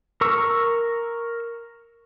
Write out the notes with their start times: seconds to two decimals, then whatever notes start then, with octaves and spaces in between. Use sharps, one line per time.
0.21 A#4 C#6 E6